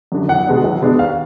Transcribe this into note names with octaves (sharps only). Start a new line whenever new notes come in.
F#2 D3
B1 F#5
B2 G#3 B3 D4
B1
B2 G#3 B3 D4
D#2 F5